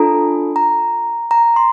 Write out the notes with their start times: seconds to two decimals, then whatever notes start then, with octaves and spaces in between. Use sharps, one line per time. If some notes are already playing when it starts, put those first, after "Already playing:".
Already playing: D4 F4 A4 A#5
0.56 A#5
1.31 A#5
1.56 C6